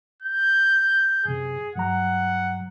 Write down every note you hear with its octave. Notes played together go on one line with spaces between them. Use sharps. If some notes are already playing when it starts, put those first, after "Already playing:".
G6
F#2 C3 G#4
G2 F#3 F#5 A#5